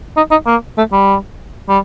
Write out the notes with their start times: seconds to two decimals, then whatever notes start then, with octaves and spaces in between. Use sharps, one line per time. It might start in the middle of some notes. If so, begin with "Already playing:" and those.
0.17 D#4
0.31 D#4
0.47 A#3
0.78 A3
0.92 G3
1.69 G3